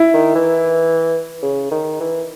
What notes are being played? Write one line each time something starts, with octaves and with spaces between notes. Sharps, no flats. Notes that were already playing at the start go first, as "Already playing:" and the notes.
Already playing: E4
D#3
E3
C#3
D#3
E3